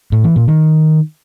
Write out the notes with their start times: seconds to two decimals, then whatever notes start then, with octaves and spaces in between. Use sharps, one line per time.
0.12 A2
0.24 E3
0.36 A#2
0.48 D#3